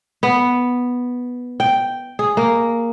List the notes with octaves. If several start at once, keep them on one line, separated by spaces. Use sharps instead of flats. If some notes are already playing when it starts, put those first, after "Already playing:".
B3
G5
G#4
A#3